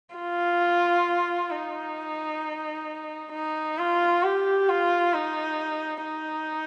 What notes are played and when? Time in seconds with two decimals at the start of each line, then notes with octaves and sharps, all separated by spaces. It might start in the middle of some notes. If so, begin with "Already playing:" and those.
0.15 F4
1.51 D#4
3.32 D#4
3.78 F4
4.23 G4
4.69 F4
5.14 D#4
6.05 D#4